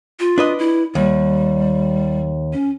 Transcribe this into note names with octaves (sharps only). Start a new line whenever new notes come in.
F4
D4 B4 D#5
E4
D#2 G3
C#4